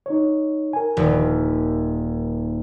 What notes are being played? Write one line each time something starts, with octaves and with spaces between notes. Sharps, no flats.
D#4 C#5
A#4 G#5
D#1